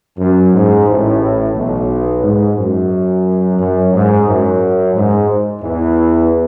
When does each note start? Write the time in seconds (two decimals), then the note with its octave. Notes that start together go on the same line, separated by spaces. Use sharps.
0.19 F#2
0.53 G#2
0.87 A1 A2
1.55 B1 B2
2.23 G#2
2.57 F#2
3.59 F#2
3.93 G#2
4.27 F#2
4.94 G#2
5.61 E2 E3